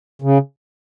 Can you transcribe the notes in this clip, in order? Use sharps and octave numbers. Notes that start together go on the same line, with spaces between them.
C#3